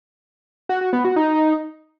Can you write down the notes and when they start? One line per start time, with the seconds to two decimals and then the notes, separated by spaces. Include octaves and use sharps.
0.69 F#4
0.81 F#4
0.93 B3
1.05 F#4
1.16 D#4